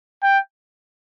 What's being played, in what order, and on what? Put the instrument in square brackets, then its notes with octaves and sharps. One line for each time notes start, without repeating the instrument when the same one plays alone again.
[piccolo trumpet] G5